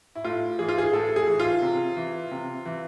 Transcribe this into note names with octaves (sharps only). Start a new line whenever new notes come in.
E4
A2 F4
E3 G#4
F4
G#4
A2 A4
G#4
E3
F4
C3
E3
C3
E3